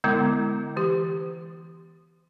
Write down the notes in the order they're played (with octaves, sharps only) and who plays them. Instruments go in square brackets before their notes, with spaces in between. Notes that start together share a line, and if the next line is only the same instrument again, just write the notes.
[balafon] D3 G#3 B3 E4 D6
E3 G4